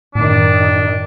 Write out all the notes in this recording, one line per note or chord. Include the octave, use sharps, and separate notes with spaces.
F#2 A2 D#3 D4